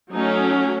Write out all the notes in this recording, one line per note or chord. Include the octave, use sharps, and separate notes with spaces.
F#3 A3 C#4 D#4